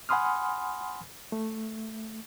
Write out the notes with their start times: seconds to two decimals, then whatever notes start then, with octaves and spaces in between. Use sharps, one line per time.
0.09 F#5 G#5 B5 C6 D#6 F6
1.32 A3